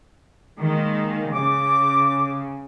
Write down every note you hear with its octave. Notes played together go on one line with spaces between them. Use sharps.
D#3 G#3 A#3
C#3 D6